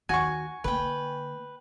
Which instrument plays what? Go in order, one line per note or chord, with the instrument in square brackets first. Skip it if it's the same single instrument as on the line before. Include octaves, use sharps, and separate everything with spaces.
[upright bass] D#2 [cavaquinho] F#4 [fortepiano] G#5 C#6
[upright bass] D3 A#3 [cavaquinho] B4 G5